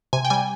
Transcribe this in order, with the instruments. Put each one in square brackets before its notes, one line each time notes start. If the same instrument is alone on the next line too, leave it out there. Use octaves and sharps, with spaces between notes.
[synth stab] C3 G#5
G5
G3 G#5